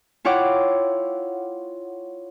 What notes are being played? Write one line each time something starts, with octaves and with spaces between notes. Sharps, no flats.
E4 F4 C#5 F#5 G5 D6